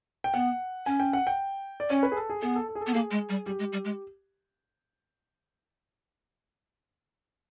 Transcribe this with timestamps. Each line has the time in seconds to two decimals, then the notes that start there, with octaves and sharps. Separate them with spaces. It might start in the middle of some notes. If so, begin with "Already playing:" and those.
0.24 G5
0.34 B3 F#5
0.86 C#4 G#5
1.00 G5
1.13 F#5
1.27 G5
1.80 D5
1.90 C#4 C#5
2.03 B4
2.12 G#4
2.16 A4
2.30 G#4
2.42 B3 G#4
2.55 A4
2.69 A4
2.75 G#4
2.81 A4
2.87 B3
2.94 A#3 G#4
3.11 G#3
3.29 G3
3.46 G3 G4
3.59 G#3
3.73 G3
3.85 G#3